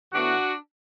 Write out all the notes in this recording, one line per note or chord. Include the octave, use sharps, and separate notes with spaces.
A2 E3 B3 D4 F#4